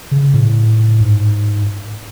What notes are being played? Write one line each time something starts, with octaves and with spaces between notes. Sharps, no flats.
C#3
A2
G#2